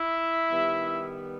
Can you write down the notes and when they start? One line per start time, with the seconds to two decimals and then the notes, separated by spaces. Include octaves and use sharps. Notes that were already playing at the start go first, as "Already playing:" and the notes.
Already playing: E4 E5
0.49 D#3 G3 B3